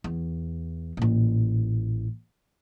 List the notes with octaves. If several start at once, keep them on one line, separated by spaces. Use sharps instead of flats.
E2
A1 A#2